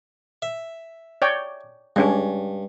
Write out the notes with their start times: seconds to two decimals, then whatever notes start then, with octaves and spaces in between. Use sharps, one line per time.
0.42 E5
1.22 C#5 D5 G5
1.96 G2 G#3 C#4 D4